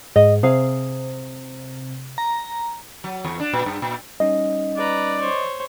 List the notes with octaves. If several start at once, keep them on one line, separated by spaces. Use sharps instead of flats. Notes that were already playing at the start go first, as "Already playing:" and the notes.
G#2 D#5
C3 G#4 F5
A#5
F#3
E2
D4
A#2
G2
A#2
G3 C#4 D#4 D#5
B4 D5 A#5
C5 C#5